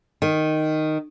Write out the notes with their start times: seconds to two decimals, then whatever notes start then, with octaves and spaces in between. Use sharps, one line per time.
0.22 D#3